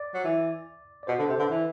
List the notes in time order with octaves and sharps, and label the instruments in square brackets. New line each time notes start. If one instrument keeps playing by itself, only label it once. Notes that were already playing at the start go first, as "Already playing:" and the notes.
Already playing: [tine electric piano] D5
[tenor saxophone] F#3
E3
[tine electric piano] D5
[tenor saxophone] B2 [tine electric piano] C5
[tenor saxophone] D3 [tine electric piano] A4
[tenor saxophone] C3 [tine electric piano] C5
[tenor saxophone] D3 [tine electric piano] B4
[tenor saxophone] E3